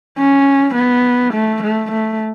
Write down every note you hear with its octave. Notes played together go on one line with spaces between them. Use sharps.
C#4
B3
A3
A3
A3